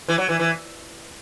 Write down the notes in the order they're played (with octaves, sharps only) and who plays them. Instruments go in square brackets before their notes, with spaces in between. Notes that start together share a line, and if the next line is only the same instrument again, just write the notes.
[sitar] E3
F#3
E3
E3